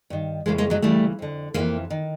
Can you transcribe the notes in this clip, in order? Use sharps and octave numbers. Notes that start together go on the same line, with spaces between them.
G2 D#3
F2 C#3 E3 G#3 A#3
G#3 A#3
F#3 G#3
D2 C#3 E3 G3 A3
F2 D3
F2 C3 E3 G#3 A#3
D#3